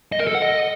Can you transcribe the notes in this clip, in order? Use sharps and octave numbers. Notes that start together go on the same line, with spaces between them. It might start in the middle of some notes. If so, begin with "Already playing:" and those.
D#5
A#4
A4
F#5
D#5